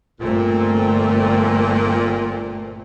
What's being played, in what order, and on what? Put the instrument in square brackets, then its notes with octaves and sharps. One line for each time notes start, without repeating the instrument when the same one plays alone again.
[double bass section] G1 A3 C4 [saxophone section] A#2